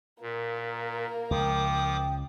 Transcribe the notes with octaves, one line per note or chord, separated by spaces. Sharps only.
A#2 A#3 A#4
C#2 F3 G5 D6 D#6